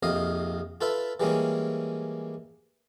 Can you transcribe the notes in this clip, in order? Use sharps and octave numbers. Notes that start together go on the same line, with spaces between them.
A#1 F2 C3 D#5 F5
F4 A4 B4 E5
E3 G3 G#3 A#3 C#4